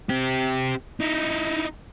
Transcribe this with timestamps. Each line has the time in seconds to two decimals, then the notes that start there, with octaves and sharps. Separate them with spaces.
0.09 C4 G4
1.01 D#4 E4